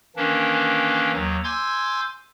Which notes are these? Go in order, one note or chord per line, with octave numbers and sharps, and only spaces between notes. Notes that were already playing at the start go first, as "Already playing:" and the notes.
D#3 E3 A#3 C#4 D4
D#2 F#3
G#5 C6 D6 E6 G6 G#6